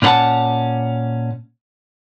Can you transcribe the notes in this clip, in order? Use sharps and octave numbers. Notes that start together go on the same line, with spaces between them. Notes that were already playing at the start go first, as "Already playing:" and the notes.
A#2 C#4 B4 F#5 A5